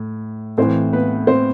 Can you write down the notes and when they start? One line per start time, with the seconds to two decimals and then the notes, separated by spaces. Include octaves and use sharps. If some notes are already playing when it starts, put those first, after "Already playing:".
Already playing: A2
0.58 A2 E3 C4 C5
0.93 B3 B4
1.27 C4 C5